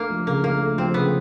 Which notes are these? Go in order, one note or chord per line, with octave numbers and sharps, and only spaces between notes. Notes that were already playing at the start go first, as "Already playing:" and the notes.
Already playing: A3 A#3 D4
F3
C#3 A#3
A#3 D4
A3
F3 C4
C#3 B3